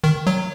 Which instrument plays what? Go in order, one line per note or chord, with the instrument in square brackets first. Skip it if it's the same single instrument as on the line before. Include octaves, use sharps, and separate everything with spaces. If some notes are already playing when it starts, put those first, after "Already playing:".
[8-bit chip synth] D#3
F#3